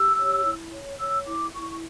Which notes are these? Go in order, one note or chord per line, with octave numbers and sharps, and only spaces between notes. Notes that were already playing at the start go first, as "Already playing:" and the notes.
Already playing: G4 E6
C#5
E4
C#5
C#5 E6
E4 D6
E4 C#6